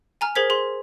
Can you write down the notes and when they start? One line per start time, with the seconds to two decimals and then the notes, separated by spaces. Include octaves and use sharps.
0.21 G#5 A#5 F6
0.35 G#4 A#4 C5 G#6 B6
0.50 G#4 C6